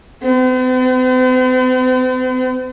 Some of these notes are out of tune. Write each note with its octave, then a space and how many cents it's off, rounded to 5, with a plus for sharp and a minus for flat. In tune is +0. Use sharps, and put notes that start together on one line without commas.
C4 -45